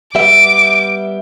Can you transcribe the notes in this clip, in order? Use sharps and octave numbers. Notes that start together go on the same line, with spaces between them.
G3 B3 E5 D6